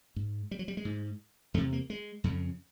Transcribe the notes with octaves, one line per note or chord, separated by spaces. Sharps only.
G#2
G3
F#3
G3
G#3
G#2
E2 C3 A3
A#3
G#3
F2 C#3